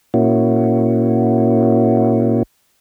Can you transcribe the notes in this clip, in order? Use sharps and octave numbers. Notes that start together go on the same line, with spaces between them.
A#2 A#3 C#4 E4 F#4